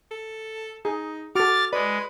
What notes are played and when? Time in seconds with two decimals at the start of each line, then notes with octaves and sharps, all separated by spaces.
0.11 A4
0.85 D#4 G#4
1.35 F#4 A4 D6 F6 A6
1.73 G#3 B4 D5